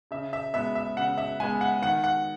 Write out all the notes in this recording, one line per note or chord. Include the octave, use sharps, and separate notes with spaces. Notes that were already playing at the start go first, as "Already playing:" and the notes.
C#3 E5
E5
G#3 B3 E5
E5
C#3 F#5
E5
G#3 B3 G#5
F#5
D#3 F#5
F#5